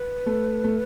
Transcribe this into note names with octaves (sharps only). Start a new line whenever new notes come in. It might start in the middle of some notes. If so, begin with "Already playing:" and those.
Already playing: B4
A3
A3